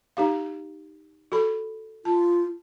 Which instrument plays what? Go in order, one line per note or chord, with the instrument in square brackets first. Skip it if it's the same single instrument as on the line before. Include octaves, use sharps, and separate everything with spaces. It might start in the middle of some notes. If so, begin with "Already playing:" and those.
[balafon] D#4 G4 F5
F#4 A4 B5
[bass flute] F4 [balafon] A5